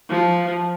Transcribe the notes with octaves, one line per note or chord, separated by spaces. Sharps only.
F3